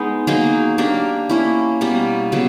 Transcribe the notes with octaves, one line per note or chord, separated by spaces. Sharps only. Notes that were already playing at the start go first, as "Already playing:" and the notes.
Already playing: G#3 B3 D#4
F#3 A#3 D#4 G#4
A#3 D4 G4 A#4
A#3 C#4 E4
B2 G3 A#3
C#3 F#3 B3